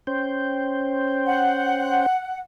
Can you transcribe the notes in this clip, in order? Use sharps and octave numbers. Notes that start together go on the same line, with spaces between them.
C#4 C5 G5
F#5